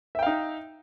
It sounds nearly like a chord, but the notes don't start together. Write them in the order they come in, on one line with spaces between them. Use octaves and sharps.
E5 G5 F5 D#4